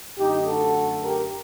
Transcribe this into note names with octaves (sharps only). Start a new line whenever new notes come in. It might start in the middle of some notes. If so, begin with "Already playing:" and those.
F#2 D3 A3 D#4 G4
F#4 A4
G4 A#4